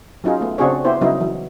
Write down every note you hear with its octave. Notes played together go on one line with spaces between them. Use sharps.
F#3 C#4 D#4 F4 G#4
A3 B3
C#3 C4 D4 F#4 G#4 C#5
B3 E4 G4 C5
C#3 F#3 G3 B3 D#4 E4
E3 F#3